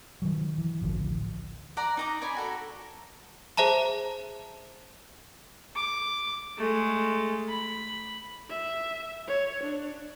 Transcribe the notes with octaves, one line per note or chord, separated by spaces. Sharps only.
D#3 F3 F#3
E3
D1 A1 D3 F3
D5 F#5 A#5
D#4 A#5 D6
C#5 D5 G#5 B5
F#4 A4 A#5
G#4 C5 E5 A5 A#5
D6
G#3 A3
B5
E5
C#5
D4